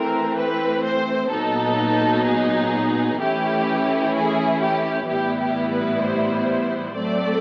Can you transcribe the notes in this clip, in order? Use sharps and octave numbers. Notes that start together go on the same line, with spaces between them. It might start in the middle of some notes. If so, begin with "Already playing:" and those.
Already playing: E3 A3 C4 A#4
B4
C5
A#2 F#3 B3 D#4 A4
G#4
E3 A3 C#4 E4 G4
G#4
G4
A2 E3 G3 B3 E4 G4
G4
B4
C5
F#3 A3 C4 D5